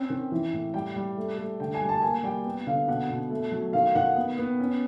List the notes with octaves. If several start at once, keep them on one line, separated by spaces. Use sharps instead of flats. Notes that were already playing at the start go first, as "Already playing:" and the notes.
Already playing: C4 C#4
D#3
E3
A2
G3 G5
G3
A3
A3
D3 G5
G#5
G3
A5
A#3 G#5
G3 G5
B3
D3 F5
B2 F#5
B2
A3
F#3
D#3 F5
D#3 F#5
B3
B3
C#4